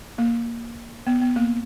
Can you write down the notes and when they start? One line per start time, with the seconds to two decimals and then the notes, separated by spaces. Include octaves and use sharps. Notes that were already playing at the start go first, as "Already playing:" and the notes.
0.18 A#3
1.07 B3
1.22 B3
1.36 A#3